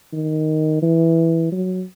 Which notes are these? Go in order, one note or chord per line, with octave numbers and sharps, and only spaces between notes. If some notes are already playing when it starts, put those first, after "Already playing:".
D#3
E3
F#3